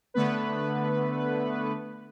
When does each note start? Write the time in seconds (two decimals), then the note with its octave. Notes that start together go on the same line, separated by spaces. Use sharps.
0.14 D3 A3 B3 B4